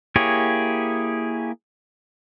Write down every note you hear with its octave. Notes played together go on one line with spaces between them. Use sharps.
A#3 E4 G4 G#4 C#5